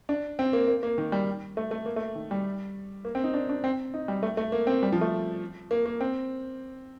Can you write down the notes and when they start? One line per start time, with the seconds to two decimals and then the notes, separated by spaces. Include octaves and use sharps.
0.09 D4
0.39 C4
0.53 A#3
0.68 A#3
0.83 A#3
0.98 D#3
1.12 G3
1.57 A3
1.71 A3
1.86 A#3
1.96 A3
2.15 D#3
2.31 G3
3.05 A#3
3.15 C4
3.24 D#4
3.34 D4
3.49 D4
3.64 C4
3.94 D#4
4.08 G3
4.23 A3
4.37 A3
4.52 A#3
4.67 C4
4.83 G3
4.92 F3
5.01 A3
5.71 A#3
5.86 A#3
6.01 C4